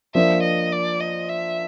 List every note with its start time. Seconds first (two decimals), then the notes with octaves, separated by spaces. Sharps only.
0.15 F3 A#3 D4 E5
0.43 D#5
0.73 D5
1.01 D#5
1.29 E5